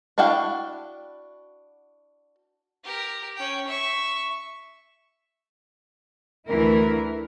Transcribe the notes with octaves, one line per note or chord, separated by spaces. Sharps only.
D4 E4 F#4 F5 G5
G4 A#4
C#4 G5
E5 C#6
D2 E3 E4 A#4